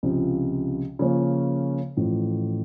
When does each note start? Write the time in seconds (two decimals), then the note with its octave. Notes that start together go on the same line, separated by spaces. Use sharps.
0.03 C#2 C3 F3
0.99 C#3 F3 A#3 C#4
1.97 A1 A2 F3